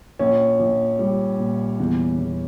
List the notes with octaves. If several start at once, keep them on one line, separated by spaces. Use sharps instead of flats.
A#1 C#4
A#1
G3
A#2
E2
E2